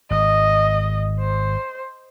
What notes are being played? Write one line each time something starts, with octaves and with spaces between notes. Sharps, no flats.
G#1 D#5
C5